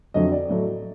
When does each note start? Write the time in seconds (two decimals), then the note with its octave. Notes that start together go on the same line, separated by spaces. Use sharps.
0.14 F2 D3 F#3 A3 D#5
0.32 D5
0.49 A2 F#3 A3